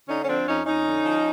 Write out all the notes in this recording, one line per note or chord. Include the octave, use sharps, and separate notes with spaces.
D3 C#4 D#4
C#4
F3 C4 D4
F2 C#4 D#4
F2 C#4 D#4
D3
F3